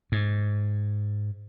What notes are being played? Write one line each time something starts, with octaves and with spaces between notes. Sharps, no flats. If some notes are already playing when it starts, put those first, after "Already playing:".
G#2